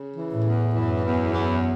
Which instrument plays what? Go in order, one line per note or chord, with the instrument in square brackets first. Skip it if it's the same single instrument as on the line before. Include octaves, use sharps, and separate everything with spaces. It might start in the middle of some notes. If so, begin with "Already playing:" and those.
Already playing: [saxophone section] C#3
E3
[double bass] A2
[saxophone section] E2
[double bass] F#2 [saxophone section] E3
[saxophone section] E2
E3